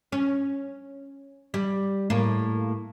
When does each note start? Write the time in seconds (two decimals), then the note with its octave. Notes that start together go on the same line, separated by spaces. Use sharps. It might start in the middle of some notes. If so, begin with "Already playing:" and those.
0.12 C#4
1.54 G3
2.10 A2 A#3